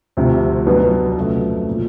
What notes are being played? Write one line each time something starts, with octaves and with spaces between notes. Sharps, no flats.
D2 C3 F3
B1 B2 F#3 B3 D4
F2 C#3 F#3 A3
A#2 F3